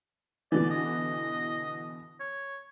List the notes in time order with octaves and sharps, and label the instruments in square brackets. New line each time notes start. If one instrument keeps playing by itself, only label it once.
[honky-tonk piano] B2 D3 E3 [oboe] D5
[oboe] D#5
C#5